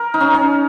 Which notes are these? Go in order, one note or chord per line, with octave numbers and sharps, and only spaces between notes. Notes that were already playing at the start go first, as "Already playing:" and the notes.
Already playing: A#4
D#4
C#4
C#4